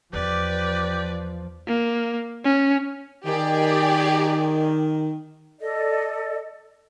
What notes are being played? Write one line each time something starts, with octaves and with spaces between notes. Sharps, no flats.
E2 F3 G4 B4 D5
A#3
C#4
D#3 G4 G#4 D5
A4 D5 D#5